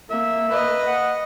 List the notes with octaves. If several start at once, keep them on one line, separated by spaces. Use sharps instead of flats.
A#3 E5
B4 D#5
F#5